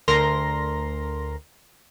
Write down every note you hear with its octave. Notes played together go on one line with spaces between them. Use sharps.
D2 A#4 A#5 C6 A#6